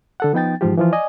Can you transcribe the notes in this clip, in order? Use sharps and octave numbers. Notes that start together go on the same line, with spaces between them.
D3 A4 F#5
F3 B3 D#4 G5 A6
G#2 E3 F3 F4 G4
E3 F3 F4
D5 D#5 G#5